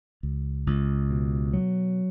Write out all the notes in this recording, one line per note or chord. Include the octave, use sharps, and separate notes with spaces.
C#2
C#2
B2
F#3